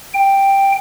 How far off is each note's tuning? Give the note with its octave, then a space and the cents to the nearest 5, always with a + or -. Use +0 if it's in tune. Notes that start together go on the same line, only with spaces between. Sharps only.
G5 +5